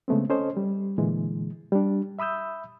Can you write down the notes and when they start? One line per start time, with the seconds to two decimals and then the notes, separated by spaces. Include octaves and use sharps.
0.08 C#3 G#3 A3 B3 C4
0.30 C#4 A4 C5 D#5
0.57 G3
0.98 A#2 D3 E3 G#3
1.72 G3 D4
2.19 E5 B5 D#6 E6 G6